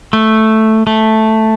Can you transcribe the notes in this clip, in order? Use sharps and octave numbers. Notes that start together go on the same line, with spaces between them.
A3
A3